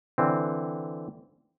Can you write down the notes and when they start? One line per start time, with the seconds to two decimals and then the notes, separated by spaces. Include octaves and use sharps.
0.18 D3 E3 C4